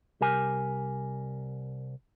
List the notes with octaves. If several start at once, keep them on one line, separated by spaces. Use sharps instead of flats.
C2 G4 A#4 G#5